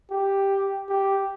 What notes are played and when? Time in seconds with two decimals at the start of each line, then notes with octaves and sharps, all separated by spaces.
0.11 G4
0.89 G4